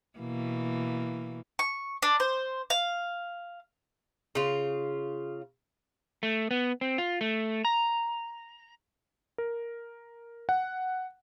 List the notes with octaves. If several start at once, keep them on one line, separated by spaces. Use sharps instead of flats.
B2 E3 A#3
C#6
D4
C5
F5
C#3 F4
A3
B3
C4
F4
A3
A#5
A#4
F#5